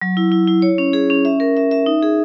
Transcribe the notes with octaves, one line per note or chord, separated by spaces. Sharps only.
F#3
E4
E4
E4
C#5
C#4
G#4
C#4
E5
A#4
E5
E5
D#4
G#4